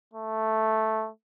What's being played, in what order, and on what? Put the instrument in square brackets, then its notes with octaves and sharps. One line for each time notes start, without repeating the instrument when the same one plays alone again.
[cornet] A3